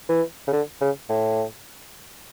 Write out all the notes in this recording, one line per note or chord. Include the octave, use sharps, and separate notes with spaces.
E3
C#3
D3
C#3
A2